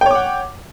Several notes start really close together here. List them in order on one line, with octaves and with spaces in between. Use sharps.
G5 C#5 D6 F#5